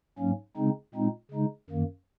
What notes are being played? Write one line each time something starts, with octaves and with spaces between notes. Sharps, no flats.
G#2 F#3 A#3 C#4
C#3 G#3 C4 D#4
A#2 G#3 C4 D#4
C#3 G#3 D#4
F#2 D#3 A#3